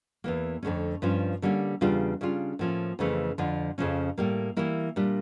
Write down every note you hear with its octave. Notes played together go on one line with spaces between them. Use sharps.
E2 E3 A#3
F2 D3 A3 C#4
G2 F3 C#4 F4
D3 G3 A#3 C#4
E2 C#3 G3 D4 F4
C#3 G3 D4 F4
A2 F3 A#3 C#4
F2 C#3 E3 A3
F2 D3 F3
F2 C#3 F3 C#4
A2 G3 A#3
E3 G3 A#3 E4
A#2 G3 D4